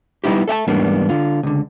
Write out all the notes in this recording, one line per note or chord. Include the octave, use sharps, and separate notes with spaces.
G3 B3 D#4 E4 G4
A4 E5 G5 A5
E2 G#2 G3 A#3 B3 D4
D3 F4
C#2 D3